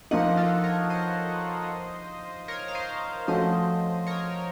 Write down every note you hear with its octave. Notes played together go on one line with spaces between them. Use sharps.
F3 A#3 D#4 D#5 F#5
F4 A4
A#4 C#5
C5 D#5
A#4 C#5
F5
C5 D#5
F3 A3 C#4 F#4 C5 D#5
A#4 C#5